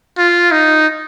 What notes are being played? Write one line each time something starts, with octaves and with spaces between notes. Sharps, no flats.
F4
D#4